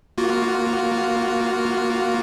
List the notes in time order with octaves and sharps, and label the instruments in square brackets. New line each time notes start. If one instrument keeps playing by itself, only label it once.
[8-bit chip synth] A#3 F4 F#4